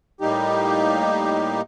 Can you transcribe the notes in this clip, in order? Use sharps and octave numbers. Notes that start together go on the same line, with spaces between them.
A2 G3 A#3 D#4 G4